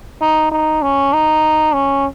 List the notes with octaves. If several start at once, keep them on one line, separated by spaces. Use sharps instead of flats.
D#4
D#4
C#4
D#4
C#4